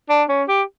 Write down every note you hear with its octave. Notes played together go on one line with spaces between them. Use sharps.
D4
C#4
G4